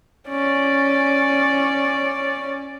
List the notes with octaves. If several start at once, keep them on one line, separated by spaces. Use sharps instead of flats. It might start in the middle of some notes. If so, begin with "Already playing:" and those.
C#4 D5